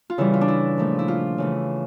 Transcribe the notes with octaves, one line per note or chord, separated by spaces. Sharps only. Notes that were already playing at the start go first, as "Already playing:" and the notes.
F4
C#3 E3 G3 E4
F4
D4
E4
A#2 F3 A3
E4
F4
C#3 E3 A3